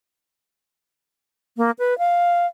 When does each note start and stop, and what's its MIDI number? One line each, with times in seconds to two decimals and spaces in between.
1.57 1.71 58
1.79 1.97 71
1.98 2.46 77